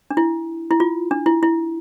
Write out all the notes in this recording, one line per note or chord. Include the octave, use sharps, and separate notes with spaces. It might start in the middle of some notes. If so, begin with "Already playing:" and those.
D4
E4
E4
F4
D4
E4
E4